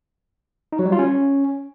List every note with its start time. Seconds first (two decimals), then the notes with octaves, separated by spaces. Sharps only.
0.72 D#4
0.79 F#3
0.86 G3
0.92 F4
0.99 C#4